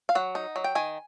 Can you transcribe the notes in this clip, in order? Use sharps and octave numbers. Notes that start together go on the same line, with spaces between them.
F5
F#3 F#5
D#4
F#3
G5
D#3 G#5